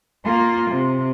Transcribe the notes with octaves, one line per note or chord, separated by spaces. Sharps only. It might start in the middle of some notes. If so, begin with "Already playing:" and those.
A#3 F4
C3